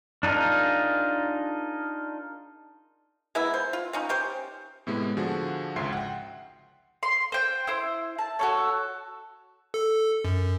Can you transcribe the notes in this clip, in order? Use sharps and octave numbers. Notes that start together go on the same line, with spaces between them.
D4 D#4 F4 G#4 A#4
G#3 A#3 B3 E4
C5
F4
C4 C#4 D#4
C#4 G4 C5
A2 C3 G#3 B3 E4
D3 F3 F#4 G#4
G#1 C#2 E5 C6 C7
F#5 G5
C6
C5 G5
E4 C5
A5
F#4 A4 C#5
A4
F#2